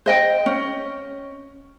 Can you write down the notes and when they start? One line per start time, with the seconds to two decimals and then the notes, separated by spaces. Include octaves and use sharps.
0.06 C5 D#5 G5
0.46 C#4